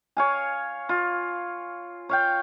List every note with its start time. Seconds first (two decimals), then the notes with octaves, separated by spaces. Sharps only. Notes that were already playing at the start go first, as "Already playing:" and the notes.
0.17 C#5 F5 G#5
0.89 F4
2.09 C#5 F5 G5